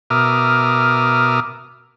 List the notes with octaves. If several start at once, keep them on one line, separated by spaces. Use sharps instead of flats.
B2 A#4 E5 D6 D#6 F6